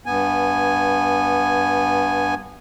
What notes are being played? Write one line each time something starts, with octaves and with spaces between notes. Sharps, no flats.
G2 B3 G#5